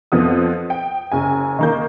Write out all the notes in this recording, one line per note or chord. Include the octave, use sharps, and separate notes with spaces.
F2 F3 B3 D#6
G5
F#1 F#2 G#5
D#3 A#3 G6